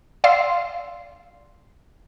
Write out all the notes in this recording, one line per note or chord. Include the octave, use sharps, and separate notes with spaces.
D5 F5 C6 E6